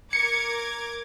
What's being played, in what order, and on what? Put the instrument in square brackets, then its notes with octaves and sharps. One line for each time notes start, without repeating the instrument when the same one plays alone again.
[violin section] A#4 D6 G#6 [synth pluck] C#7